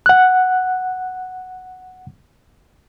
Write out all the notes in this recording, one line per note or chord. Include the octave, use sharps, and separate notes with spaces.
F#5 F#6